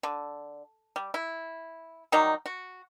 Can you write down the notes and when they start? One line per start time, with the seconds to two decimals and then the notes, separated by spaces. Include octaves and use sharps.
0.03 D3
0.96 G3
1.14 E4
2.12 D#3 F#3 G3 D#4
2.46 F#4